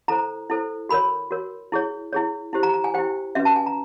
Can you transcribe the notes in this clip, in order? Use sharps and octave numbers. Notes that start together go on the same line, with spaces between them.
E4 A4 C5 A#5
E4 A4 C5
F#4 A#4 C#5 B5
F#4 A#4 C#5
E4 G#4 C#5
E4 G#4 C#5
E4 G4 C5
A#5
A#5
G#5
E4 G4 C5 G5
C#4 F#4 B4 E5
A5
G#5
A#5